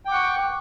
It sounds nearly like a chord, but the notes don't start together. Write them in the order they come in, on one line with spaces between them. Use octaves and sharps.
G5 D6 F#5 C#6